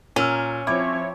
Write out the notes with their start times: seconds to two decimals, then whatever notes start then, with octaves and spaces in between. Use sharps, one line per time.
0.16 A#2 C#4 A#4 E6
0.67 F3 C4 E4 C#5 D6